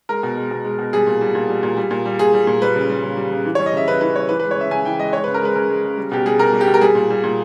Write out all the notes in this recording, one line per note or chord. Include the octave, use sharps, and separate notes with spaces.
G#3 A#4
B2
G#3
B2
G#3
B2
G3 G#4
A#2
G3
A#2
G3
A#2
G3
A#2
G3
A#2 G#4
G3
A#2
G3 B4
C#3
G3
C#3
G3
C#3
E3
G3 C#5
D#5
C#3 E5
C#3 B4
E3 B4
G3 C#5
E3 B4
G#3 B4
C#5
C#3 E5
C#3 G#5
E3 G5
G#3 D#5
G#3 C#5
C#3 B4
A#4
G#3 B4
C#3 A#4
G#3
C#3
G3
B2 G4
G3 G#4
B2 A#4
G3
G4
B2
A#4
G3 G#4
A#2
G3
A#2